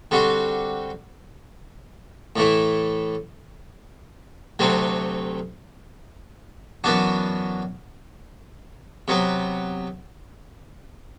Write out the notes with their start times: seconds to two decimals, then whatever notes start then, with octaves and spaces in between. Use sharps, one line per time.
0.11 D3 G3 C4 F#4
2.36 A2 E3 A3 E4
4.59 D2 C3 F#3 A3 C4
6.84 F#2 E3 B3 D4 F#4
9.08 C3 F#3 B3